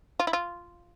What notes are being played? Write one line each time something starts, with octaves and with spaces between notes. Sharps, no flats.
F4
E4
F4